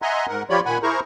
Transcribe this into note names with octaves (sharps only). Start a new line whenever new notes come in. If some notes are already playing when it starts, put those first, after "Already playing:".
D#5 E5 F#5 G#5 A#5 C6
G#2 A#4 F#5
F3 F4 G4 C#5 D5 B5
A#2 D#3 F#5 G#5 B5
E4 G#4 A#4 C5 A#5 C#6